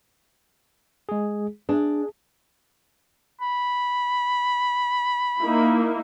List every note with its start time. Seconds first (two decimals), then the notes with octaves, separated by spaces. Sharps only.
1.09 G#3 G#4
1.69 D4 G#4
3.41 B5
5.40 A#3 D#4 E4